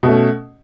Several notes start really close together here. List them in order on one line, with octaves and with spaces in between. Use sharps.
B2 A3 C#4